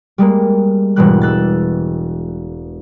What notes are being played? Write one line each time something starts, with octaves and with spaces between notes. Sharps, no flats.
G3 G#3 A#3
E1 G#2 B2 E3 G3 F#6
E6 F#6 A6